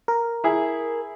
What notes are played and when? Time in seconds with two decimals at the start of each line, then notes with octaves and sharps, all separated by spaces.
0.08 A#4
0.44 E4 G#4